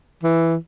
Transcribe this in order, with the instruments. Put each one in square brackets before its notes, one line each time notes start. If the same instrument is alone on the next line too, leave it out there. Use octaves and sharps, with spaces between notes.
[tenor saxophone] E3